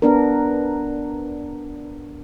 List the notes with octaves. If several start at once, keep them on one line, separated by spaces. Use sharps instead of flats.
B3 D4 A#4